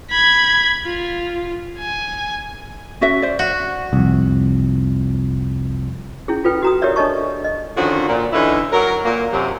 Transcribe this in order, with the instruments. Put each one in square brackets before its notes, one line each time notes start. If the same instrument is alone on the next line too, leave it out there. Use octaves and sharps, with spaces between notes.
[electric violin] B5 G#6
F4
G#5
[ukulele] C#4 F#4 E5
C5 D5
[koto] F#4
[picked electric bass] C2 F2
[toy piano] C#4 E4 G#4
F4 A4 B4 G5
F#4 A#5 D#6
G4 A#4 C#5 D5 E5
D4 A4 C#5 D#5 A5 C#6
D#5
[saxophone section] D3 D#3 F3 C#4 F4 F#4
A#2
D3 E3 C#4 D#4 E4
F#3 A#4
A#2 A#3
F#2 C3 F#3